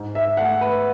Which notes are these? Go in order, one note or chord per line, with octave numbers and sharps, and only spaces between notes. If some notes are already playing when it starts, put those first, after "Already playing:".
Already playing: G#2
E5
A3 F#5
B4